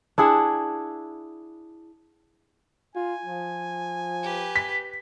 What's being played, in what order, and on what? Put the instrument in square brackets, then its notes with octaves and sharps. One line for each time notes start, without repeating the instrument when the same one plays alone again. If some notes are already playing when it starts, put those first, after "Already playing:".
[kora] D4 E4 G#4 F#5
[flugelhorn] F4 [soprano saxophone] G#5
[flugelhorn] F3
[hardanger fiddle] G4 B4
[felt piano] B6